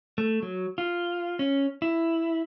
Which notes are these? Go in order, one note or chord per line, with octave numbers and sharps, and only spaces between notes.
A3
F#3
F4
C#4
E4